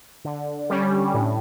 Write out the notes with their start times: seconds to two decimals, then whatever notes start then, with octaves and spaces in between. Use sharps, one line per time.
0.25 D3
0.70 G3 C#4
1.14 A2